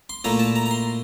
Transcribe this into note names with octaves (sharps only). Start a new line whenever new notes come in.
C6
A#2 A3 E4 A#5
A5
A#5
A#5
C6